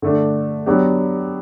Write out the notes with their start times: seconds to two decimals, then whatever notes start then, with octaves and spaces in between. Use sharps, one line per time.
0.02 D3 A3 D4
0.66 F#3 B3 D4 G4